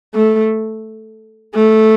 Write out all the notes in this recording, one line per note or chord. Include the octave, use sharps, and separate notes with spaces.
A3
A3